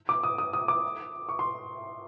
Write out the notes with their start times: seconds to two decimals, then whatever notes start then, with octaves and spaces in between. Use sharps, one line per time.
0.09 D6
0.23 D#6
0.38 D#6
0.53 D#6
0.68 D6
1.29 C#6
1.39 C6